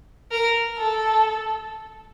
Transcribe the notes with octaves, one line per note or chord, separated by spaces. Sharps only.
A#4
A4